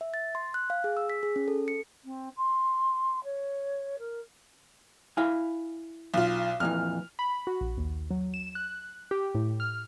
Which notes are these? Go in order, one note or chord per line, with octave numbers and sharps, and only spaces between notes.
E5
A6
C6
F#6
F5
G#4
E6
B6
G#4
C#4
A4
C#7
C4
C6
C#5
A#4
E4 F5 G#5
B1 F4
F2 A#2 E3 F6
B5
F#4
A#1
D#2
F#3
E7
F#6
G4
A2
F6